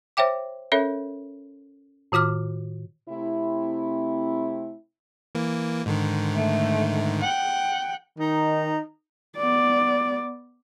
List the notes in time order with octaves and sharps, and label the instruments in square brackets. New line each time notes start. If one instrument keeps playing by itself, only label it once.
[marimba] C5 C#5 E5 G5 D6
C#4 A4 A#4 C#5 E5
A2 D#3 F4 D6 F6
[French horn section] C3 A3 C4 E4
[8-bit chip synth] E3 A#3
G#2 D3 D#3
[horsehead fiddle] A3
F#5 G5
[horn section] D#3 D#4
[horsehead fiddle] B3 D5